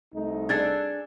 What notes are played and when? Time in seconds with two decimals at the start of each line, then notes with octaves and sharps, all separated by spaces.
0.14 C2 A3 D#4
0.49 D4 G#4 A4 G#6 A6